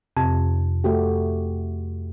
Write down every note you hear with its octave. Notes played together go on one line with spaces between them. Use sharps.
F2 C3
A3 F#4 G4